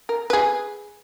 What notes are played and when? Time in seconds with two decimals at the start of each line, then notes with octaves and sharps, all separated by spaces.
0.09 A#4
0.30 G#4 B4